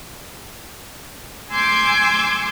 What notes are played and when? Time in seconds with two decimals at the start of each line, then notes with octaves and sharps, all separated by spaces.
1.51 G#5 C6 D6 E6 G6 G#6